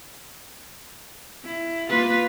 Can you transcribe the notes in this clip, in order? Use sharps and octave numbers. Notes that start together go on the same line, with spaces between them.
E4
A#3 F4 B4